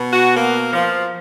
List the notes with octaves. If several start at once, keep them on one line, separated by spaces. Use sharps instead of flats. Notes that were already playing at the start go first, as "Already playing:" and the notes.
Already playing: B2
F#4
A#3
F3